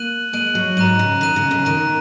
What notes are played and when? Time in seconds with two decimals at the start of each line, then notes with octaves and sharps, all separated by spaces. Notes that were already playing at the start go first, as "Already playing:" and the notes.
Already playing: A#3 F#6 D#7 F#7
0.33 G#3 F#6 D#7 F#7
0.55 F#3
0.77 G#2 A#5 F#6 D#7
0.99 C#3
1.21 D#3 A#5 F#6 D#7
1.36 C#3
1.51 C#3
1.65 D#3 A#5 F#6 D#7